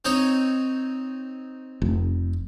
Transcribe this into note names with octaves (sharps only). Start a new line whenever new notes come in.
C4 D#4 C#5
F1